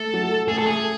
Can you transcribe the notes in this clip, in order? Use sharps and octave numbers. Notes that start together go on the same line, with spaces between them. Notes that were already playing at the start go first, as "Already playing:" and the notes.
Already playing: A3 A4
F#3
A3 G#4
A4
G#4